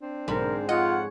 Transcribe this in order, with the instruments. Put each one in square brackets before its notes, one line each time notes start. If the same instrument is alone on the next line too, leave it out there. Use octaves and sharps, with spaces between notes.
[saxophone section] C4 D4
[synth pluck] B1 D3 B5 [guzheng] G#2 [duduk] A#4
[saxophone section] F2 F#5 [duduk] F4 [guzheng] C#5 [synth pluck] D#5